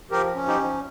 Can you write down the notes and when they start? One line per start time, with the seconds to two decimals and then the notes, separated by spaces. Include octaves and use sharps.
0.11 F3 G4 A#4
0.35 C#4
0.47 D#4 G4
0.60 F3